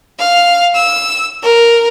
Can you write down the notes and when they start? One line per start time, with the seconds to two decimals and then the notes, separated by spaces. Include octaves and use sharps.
0.18 F5
0.74 E6
1.42 A#4